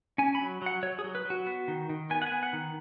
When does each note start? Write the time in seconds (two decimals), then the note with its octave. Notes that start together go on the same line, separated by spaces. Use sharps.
0.18 C#4 G#5
0.35 B5
0.40 F#3
0.62 F#3 F#5
0.83 F#3 C#5
0.99 G#4
1.04 F#3
1.15 B4
1.25 F#3 F#4
1.47 B3
1.68 D#3
1.90 D#3
2.10 B3 G#5
2.22 F#5
2.27 G#5
2.32 B3
2.43 F#5
2.53 D#3